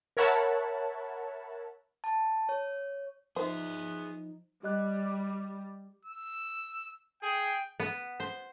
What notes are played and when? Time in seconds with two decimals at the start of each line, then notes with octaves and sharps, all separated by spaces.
0.17 A#4 C#5 E5 F#5 A5 B5
2.04 A5
2.49 C#5
3.36 F3 B3 D#4 G#4 C5 E5
4.63 G3 G4 D#5 F#6
6.05 E6
7.23 G#4 G5
7.80 B3
8.20 C5